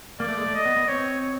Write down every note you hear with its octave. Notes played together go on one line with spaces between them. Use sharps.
A#3 D5
A3
G#3
A3
D#5
B3
B3
C4 C#5